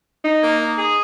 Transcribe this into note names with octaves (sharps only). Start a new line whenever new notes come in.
D#4
A#3
D#4
G#4